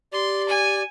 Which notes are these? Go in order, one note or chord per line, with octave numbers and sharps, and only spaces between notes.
G4 D5 C6
G#5